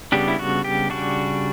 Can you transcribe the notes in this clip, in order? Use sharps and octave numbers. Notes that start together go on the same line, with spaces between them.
C#3 G3 B3 D4 G4
E4
F#4
G4
C#3 G3 D4 F#4